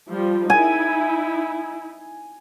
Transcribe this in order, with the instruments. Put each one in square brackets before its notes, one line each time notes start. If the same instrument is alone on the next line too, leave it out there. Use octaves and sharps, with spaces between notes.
[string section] F3 G3
[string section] D#4 E4 [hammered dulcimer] G#5